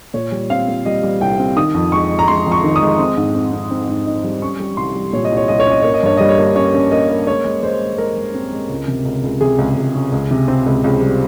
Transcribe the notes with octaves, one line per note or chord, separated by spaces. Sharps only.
A#2 C#5
G3
C4 F5
A#2
G3 D#5
G3
C2 G5
C4
D#3 D#6
F2
G#3 C#6
G#3
A#5
G#3 C6
F2
C#6
D#3
D#6
G#3
C4
G#2
C4
C4
C4
G#2
D#4
G3
C#4 C#6
G3
C2 C6
G3
A#2 C#5
D#5
C2
C#5
C2 D#5
C#5
C#4 D#5
A#3 C#5
D#5
G2 C#5
G3 D#5
C#5
A#3
C#4 C#5
C#4
A#3 D#5
A#3
G#3 C#5
G#3
G#3 C5
G#3
G#3 A#4
G#3
C4
G#3
C#2
C3
C#2
C#2
C3 G#4
C#2
C#2
C#4
C#2
C3
C4
C#2
C#2
G3